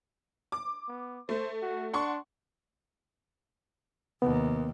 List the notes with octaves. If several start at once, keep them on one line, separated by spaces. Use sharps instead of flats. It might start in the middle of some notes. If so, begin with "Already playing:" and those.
D6
B3
A3 C5
F#4
D4 F#5 C6 C#6
D#2 C3 B3